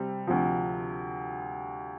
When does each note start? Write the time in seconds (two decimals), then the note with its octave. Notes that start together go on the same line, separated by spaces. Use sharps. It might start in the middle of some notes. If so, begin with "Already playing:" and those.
Already playing: C3 G3 C4
0.27 D2 C3 F3